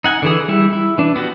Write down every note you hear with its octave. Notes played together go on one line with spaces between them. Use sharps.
D#4 F#5 G#5
D3 E3 G#4
G3 E4
E4
E3 D4
B3 F#4 G4